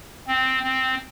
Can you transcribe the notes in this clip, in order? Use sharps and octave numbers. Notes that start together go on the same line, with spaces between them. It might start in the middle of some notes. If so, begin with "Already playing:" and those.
C4
C4